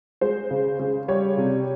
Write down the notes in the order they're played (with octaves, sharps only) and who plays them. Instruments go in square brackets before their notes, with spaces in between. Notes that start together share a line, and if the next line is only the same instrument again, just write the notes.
[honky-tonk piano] G#3 C5
C#3
C#3
G3 C#5
C3